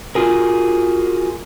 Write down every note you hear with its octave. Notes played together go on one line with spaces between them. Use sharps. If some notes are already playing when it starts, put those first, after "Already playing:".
F4 F#4 G#4 A#4